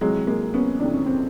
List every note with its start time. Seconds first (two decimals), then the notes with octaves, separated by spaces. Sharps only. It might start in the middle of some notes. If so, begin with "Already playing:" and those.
0.01 F2 C3 E3 F#3 G#3
0.27 G#3 A#3
0.54 B3 C#4
0.80 F2 C3 E3 D4
0.94 C#4
1.06 C4